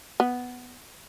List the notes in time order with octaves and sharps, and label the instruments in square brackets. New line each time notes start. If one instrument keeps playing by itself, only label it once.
[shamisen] B3